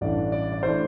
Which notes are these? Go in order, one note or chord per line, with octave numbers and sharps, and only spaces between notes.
A1 G2 E3 A3 D4 D5
D5
D5
E3 A3 D4 C5